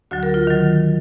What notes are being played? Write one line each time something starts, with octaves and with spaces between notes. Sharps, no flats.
D2 D3 F#3 F#4
A#4
F4
D#3 F#3